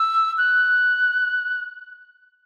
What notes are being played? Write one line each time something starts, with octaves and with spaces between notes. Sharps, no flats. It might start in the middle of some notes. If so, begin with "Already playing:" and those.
Already playing: E6
F#6